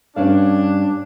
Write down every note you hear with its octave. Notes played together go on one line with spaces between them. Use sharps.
G2 C#4 D4 F5